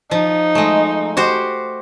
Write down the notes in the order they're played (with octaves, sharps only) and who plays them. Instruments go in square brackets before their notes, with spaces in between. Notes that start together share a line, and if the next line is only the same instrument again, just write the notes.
[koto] F3 [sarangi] D#4
[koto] G#3 A3
F#4 G4 C5